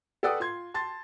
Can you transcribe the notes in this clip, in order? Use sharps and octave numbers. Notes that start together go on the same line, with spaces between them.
A4 B4 D5 F#5 G5 D#6
F4 C6 G#6
A5 C6 A6